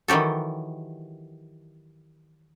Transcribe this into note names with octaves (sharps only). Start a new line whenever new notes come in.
D#3 E3 F#3 G4 A4